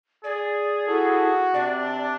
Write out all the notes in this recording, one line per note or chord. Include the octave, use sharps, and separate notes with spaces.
G#4 D5
E4 F#4 A4
C3 D4 D5